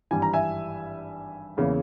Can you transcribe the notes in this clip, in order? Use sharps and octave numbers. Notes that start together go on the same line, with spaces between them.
G#1 G2 E3 G3 G#5
A#5
E5 G#5
E2 C#3 E3 A#3 C#4